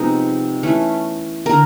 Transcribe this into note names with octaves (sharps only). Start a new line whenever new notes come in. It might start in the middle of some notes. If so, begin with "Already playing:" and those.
Already playing: C3 F3 G#3 B3 D#4
E3 A3 C#4
D3 A#4